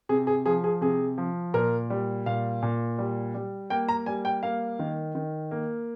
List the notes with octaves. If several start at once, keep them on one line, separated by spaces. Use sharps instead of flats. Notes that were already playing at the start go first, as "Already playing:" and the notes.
C3 G#4
G#4
F3 G#4
G#4
C3 G#4
F3
A#2 A#4
G3
A#2 F5
A#2
G3
G3
A#3 G5
A#5
G3 G#5
G5
A#3 F5
D#3
D#3
A#3